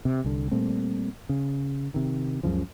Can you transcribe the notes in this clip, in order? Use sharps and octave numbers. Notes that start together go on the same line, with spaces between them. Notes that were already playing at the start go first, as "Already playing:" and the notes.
C3
C2 D3
A#2 G3 A3 C4
C#3
C3 D#3
C#2 F#2 C#3 F3